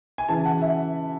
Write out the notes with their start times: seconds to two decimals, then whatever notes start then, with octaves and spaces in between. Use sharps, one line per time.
0.18 G#5
0.28 C#3 E3 A5
0.45 F#5
0.62 E5